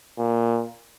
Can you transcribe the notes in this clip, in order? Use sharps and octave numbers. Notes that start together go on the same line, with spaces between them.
A#2